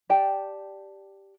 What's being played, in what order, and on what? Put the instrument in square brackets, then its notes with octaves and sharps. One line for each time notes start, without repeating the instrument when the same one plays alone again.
[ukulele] G4 D5 G5 A5